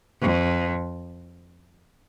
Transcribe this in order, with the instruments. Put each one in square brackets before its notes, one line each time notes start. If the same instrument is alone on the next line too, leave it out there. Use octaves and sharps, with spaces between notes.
[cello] F2